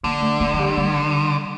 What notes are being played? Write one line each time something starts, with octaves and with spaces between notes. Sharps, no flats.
D3 A#3
A3
A3
F3
G3
G3